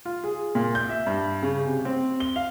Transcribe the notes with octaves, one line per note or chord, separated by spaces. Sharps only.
F4
G#4
A#2
G6
E5
G2
C#3
C3
C4
G7
F5